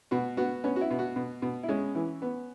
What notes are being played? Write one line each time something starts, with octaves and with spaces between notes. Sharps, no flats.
B2 F#4
B3 F#4
B3 C#4
F#4
E4
B2
F#4
B2
B2
E4
G#3 C#4
E3
B3